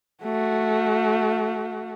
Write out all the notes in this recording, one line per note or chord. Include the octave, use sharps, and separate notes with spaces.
A3 F#4